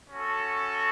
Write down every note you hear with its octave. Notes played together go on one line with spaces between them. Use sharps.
C#4 F#4 A4